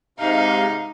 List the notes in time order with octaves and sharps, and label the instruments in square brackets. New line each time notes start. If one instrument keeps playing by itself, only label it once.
[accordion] G#2 C3 F5 [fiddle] D#4